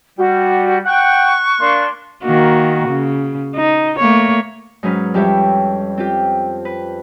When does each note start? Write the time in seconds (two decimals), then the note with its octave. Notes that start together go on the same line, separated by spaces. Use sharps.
0.18 G3 F#4
0.86 F#5 G5 C#6 F#6
1.60 A#3 D4 C6
2.24 D#3 A#3 F#4
2.88 C#3
3.55 D#4
3.99 A3 A#3 C#5
4.83 G#2 F#3 C#4 B4 F6
5.14 F2 G3 G4 C#5 E5
5.98 C4 F4 G4
6.65 B4